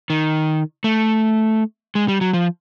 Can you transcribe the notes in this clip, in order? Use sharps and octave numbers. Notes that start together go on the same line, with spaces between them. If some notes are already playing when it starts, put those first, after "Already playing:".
D#3
A3
G#3
G3
F#3
F3